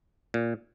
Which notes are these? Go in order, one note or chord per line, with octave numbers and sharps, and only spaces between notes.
A#2